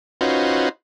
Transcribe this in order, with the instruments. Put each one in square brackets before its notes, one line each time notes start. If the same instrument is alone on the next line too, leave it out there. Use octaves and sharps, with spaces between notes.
[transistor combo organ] C#4 D#4 F4 F#4 B4 C5